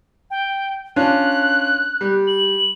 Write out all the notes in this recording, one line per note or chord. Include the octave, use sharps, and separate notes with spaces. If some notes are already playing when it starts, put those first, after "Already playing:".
G5
C#4 D4 F4 F#6
G3
F#7